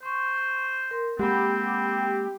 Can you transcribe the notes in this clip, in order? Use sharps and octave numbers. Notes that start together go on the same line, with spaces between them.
C5 C6 C#6
A#4 C6
G#3 A#3 C4 G4 F#5 B5